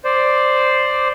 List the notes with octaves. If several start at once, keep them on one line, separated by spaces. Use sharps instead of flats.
C5 D5